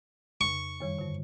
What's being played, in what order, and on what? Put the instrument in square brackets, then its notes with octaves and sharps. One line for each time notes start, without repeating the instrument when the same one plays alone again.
[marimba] F2 C#3 [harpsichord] C#6
[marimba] F#2 D#3 G3
G2 D3